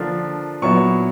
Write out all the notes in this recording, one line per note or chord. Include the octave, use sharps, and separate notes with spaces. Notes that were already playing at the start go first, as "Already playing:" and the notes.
Already playing: D3 F3 A#3 D4 F4
A#2 F#3 B3 E4 C#6